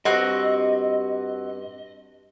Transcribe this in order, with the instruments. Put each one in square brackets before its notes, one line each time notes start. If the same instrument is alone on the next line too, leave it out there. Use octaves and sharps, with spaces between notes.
[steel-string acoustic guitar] G2 [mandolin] C4 F#4 [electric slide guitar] D#5